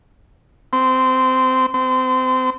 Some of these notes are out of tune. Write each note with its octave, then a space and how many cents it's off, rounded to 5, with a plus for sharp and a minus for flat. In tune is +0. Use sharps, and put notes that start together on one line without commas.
C4 -15
C4 -25